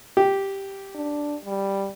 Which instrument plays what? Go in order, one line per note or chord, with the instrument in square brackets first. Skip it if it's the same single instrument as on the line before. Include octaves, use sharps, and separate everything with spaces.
[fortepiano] G4
[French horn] D4
G3